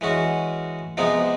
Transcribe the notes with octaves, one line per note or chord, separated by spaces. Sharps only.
E3 G#3 C#4 F#4
C3 F3 G#3 B3 D#4